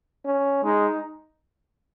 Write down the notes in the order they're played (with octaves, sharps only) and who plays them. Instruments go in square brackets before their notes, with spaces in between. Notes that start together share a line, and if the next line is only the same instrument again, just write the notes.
[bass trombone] C#4
[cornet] G#3 [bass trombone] D#4